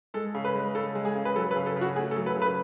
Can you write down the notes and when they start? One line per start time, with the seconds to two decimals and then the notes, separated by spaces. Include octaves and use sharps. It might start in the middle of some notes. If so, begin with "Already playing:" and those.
0.14 G#3 A4
0.35 C#3
0.45 B4
0.55 G#3
0.75 C#3 A4
0.95 G#3
1.05 G#4
1.16 C#3
1.25 B4
1.36 F#3 A4
1.51 B4
1.56 C#3
1.66 A4
1.76 C#3
1.81 F#4
1.96 A3 G#4
2.11 A4
2.16 F#3
2.26 B4
2.36 C#3
2.42 B4